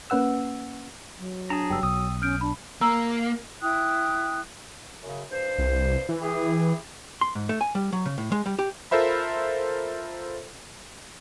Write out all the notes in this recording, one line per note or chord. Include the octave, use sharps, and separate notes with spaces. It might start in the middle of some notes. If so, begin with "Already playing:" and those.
A#3 C#4 B4 F#5 E6
F#3
D4 G#4 A5 A#5
F#1 G2 G5 E6
B1 D#6
C#4 F6 G6 D7
D4 B5
A#3 A#5 E6
E4 G5 D#6 F#6
F#2 C#3
G2 C5
C2
E3
E4 G4 G#4
C6
G#2
A3
G#5
G3
F#3
C#3
A2
G#3
G3
G4
F4 A4 A#4 C5 E5 B5